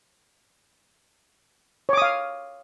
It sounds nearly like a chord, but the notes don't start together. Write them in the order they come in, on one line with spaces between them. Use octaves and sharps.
C#5 D6 D#6 F5